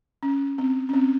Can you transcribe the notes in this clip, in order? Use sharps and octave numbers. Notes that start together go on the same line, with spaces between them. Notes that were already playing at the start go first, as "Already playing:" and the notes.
C#4
C4
C#4
C4